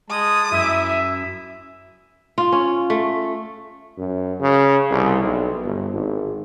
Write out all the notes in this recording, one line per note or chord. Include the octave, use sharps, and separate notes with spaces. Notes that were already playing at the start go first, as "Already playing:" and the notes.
G#3 A5 D#6
F#2 E4 E5
F4
C#4
A3
F#2
C#3
C2
B1
G1
G#1